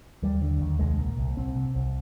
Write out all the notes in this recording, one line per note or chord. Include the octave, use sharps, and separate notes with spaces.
D#2 G3
D3
D#2
C2 G#3
A#2
C2
C2 C4
C3
C2